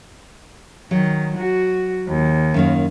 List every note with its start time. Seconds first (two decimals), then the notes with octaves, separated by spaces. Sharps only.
0.91 D#3 F#3
1.37 F#4
2.08 D#2
2.54 F#2 D#3 A#3